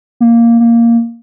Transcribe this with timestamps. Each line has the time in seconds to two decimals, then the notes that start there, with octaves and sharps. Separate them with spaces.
0.20 A#3
0.60 A#3